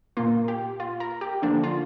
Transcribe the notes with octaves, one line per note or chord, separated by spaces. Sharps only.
A#2 A#3 F4
G4
F4
A#4
G4
D3 F3 A#3 D4
F4